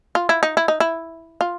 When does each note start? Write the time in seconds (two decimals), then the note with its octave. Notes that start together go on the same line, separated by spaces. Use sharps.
0.15 F4
0.29 E4
0.43 D#4
0.57 E4
0.68 D#4
0.80 E4
1.41 F4